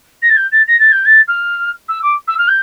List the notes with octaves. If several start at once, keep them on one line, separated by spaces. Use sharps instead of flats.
A#6
A6
G6
A6
A#6
A6
G6
A6
F6
E6
D6
E6
F6
G6